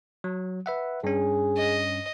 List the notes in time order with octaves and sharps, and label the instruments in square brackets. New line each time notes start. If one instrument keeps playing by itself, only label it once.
[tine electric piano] F#3
B4 E5 F#5
[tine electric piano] G2 C#4 [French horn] G#4
[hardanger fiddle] D#5